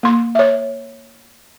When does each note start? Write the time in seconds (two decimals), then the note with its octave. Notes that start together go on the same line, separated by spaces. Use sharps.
0.03 A#3 C6
0.35 C#5 E5